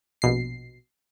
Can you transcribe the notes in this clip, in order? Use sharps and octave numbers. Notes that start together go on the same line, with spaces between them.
A#1 B2 C7